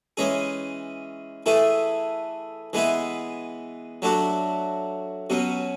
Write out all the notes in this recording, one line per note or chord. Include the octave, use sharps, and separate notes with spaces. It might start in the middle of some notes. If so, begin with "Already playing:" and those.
E3 G#3 C#4 G#4
E3 A3 E4 G#4
E3 G#3 B3 E4 G#4
F#3 A3 D4 F#4
B2 F#3 C#4